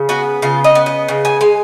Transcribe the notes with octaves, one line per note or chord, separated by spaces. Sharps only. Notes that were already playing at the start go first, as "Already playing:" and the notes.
Already playing: C#3
B3 F#4
C#3 F4
D#5
B3
D#5
C#3
G#5
G#3 G#5